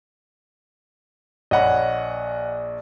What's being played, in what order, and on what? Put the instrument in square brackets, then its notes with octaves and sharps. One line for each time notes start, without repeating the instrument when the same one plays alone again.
[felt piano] A#1 C#5 B5 [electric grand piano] D#5 F#5